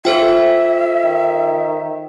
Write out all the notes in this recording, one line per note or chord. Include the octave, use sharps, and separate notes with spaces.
F4 A4 C5 E5 G5
D#3